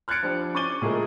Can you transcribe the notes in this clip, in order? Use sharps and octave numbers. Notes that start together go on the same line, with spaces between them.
F6 F#6 G#6 A6 C#7 D7
F3 G3 D4
C#4 C#6 D6 A6 D#7 G7
A#2 G#3 A3 E4 G#4 A#4